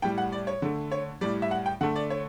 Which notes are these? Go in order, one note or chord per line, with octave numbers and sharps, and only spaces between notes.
A2 G3 G5
F#5
D5
C#5
D3 A3
C#5
A2 G3 D5
E5
F#5
G5
D3 A3 F#5
D5
C#5